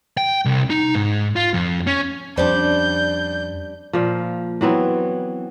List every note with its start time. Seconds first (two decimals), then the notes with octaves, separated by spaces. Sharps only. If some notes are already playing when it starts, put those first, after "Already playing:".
0.17 G5
0.45 C2
0.70 D#4
0.95 G#2
1.36 F4
1.54 F2
1.87 C#4
2.37 F2 G3 C#4 D4 C5 D5 G6
3.93 A#2 F3
4.61 E3 F#3 B3 C4